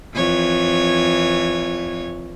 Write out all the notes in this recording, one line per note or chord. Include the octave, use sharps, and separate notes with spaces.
F2 E3 C#5